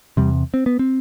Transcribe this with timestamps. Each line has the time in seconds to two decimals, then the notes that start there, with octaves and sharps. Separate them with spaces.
0.17 E2 C3 G3
0.54 C4
0.66 B3
0.79 C4